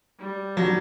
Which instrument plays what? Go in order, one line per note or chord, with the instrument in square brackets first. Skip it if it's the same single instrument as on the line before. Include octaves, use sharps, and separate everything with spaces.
[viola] G3
[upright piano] F#3